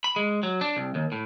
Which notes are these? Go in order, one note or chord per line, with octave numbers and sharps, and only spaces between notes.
B5
G#3
F#3
D4
C2
D#2
A2